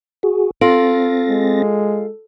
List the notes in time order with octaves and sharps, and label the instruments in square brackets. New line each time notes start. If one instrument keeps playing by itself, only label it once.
[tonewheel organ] F#4 G#4
[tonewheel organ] C4 A6 A#6 [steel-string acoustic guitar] F4 [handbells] A4
[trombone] G#3